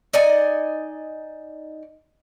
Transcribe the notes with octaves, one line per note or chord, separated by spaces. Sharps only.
D#4 D5 D#5 G#5